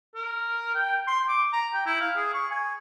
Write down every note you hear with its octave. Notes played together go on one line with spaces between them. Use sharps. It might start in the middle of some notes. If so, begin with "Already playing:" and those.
A#4
G5
C6
D6
A#5
G5
E4
F5
G#4
C#6
G#5